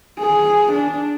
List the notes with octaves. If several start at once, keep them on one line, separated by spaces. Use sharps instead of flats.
G#4
D4